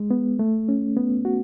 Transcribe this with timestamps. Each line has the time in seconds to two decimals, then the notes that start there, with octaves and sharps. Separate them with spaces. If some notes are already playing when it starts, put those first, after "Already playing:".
Already playing: G#3
0.11 B3
0.39 A3
0.69 C#4
0.97 B3
1.25 F#4